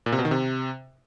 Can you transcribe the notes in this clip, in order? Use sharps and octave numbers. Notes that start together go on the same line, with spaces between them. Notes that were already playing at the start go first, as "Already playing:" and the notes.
A#2
C3
B2
D#3
C3